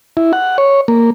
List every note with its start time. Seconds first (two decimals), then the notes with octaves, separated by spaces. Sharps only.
0.17 E4
0.33 F#5
0.58 C#5
0.88 A#3